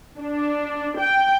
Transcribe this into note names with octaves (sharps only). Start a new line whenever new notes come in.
D4
G5